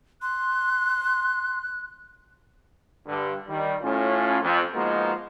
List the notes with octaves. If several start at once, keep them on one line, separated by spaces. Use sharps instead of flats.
C6 F#6
G2 D3
D#3 G3
A2 C#4 F4
F2
F3 G#3 A#3 B3 D#4 F#4